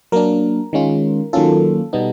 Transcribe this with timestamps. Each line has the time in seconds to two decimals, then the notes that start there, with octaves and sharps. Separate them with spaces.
0.12 F#3 A#3 D4 A#4
0.73 D#3 G#3 C#4 F4
1.33 D#3 F#3 A#3 C#4 F4 A4
1.93 B2 G3 B3 D#4